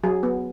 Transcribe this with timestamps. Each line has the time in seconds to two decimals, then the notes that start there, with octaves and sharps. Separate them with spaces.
0.04 F#3 G#4
0.23 B3